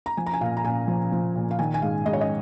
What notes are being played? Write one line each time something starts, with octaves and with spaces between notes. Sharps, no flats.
A#5
F3 G#5
A#5
G#5
A#2 F5
A#5
A#2 G#5
F3
F3
A#2
F5
D#3 G#5
G#5
G#2 F5
G#2 D#5
C#5
D#5